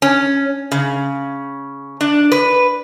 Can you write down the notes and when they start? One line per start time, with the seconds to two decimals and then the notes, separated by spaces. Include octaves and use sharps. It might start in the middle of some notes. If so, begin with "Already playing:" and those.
0.02 C#4
0.72 C#3
2.01 D4
2.32 B4